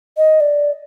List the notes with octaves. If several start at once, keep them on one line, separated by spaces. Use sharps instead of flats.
D#5
D5